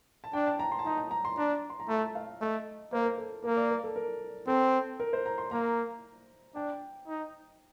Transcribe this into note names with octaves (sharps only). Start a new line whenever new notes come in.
A5
D4 G5
A5
A#5
C6
A5
D#4 A#5
A#5
A#5
C6
D4 A#5
C6
A#5
A3 A5
F5
A3 D#5
A#3 C5
A#4
A4
A#3 A#4
D5
A#4
A4
A#4
C4 A4
A#4
C5
A#5
C6
A#3 A#5
D4 G5
D#4